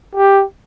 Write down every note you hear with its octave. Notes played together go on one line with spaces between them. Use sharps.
G4